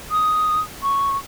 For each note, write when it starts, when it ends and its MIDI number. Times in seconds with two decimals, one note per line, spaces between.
0.11 0.60 87
0.82 1.17 85